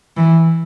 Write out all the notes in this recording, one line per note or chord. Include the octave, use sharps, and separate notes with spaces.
E3